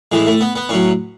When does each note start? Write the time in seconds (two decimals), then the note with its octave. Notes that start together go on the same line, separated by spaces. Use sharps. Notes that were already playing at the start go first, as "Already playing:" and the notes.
0.12 A2 E3 G#3
0.27 A3
0.41 B3
0.56 B3
0.69 A2 F#3 C#4